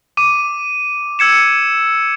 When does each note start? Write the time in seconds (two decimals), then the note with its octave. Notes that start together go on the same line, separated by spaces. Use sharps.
0.17 D6 D#7
1.19 E6 G#6 C#7 E7